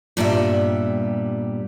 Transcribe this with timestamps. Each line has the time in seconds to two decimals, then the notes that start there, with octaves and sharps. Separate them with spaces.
0.17 G2 A#2 G3 B3 E5